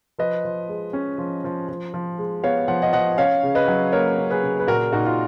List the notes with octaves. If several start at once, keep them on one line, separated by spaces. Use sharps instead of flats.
F3 B4 D#5
F3
G#3
C#4
F3
F3
F3
F3
G#3
B3 C#5 F5
F3 F#5
D#5 F#5
F3 D#5 F#5
C#4 C#5 F5
C#3
B4 D#5
F#3
A#3 A#4 C#5
C#4
G#4 B4
C#3
B4
A#2 F#4 A#4
A#2 D#4 F#4
F4